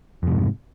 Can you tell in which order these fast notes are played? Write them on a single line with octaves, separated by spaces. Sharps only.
F2 C3 G#2